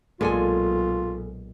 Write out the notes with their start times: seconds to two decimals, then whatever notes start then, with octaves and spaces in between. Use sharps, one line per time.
0.21 B1 A#2 G#3 F4 G#4 A4 G#5